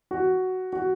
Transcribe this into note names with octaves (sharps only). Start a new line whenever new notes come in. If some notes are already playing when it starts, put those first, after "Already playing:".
F#4
F#4